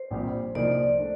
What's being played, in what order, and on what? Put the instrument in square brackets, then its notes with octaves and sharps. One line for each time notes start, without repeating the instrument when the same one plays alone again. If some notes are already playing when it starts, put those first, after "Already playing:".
Already playing: [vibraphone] C5
[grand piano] A#1 A#2 G3 C4 G4
[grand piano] C2 A#2 F3 A#3 D#4 [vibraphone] D5
[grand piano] A3 D4